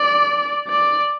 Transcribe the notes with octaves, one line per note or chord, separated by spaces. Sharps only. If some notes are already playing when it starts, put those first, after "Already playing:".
Already playing: D5
D5